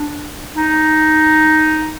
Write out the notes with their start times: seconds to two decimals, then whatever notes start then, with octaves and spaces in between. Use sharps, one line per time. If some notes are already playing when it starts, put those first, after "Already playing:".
Already playing: D4
0.55 D#4